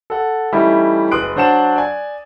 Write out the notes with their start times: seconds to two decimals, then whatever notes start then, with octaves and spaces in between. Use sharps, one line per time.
0.10 A4 F#5
0.52 E3 G3 A3 C#4 D#4 E4
1.11 F#1 B4 C6 D#6 F#6 D7
1.36 F#3 D4 C5 F#5 A5 E7
1.76 D5 G#5